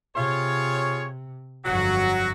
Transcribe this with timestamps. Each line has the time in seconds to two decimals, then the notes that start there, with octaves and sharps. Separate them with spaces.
0.15 C3 F4 G#4 C#5
1.65 G1 F2 F#3 F#4